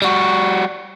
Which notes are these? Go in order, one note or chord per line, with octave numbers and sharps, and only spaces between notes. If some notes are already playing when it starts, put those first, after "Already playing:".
G3 F#4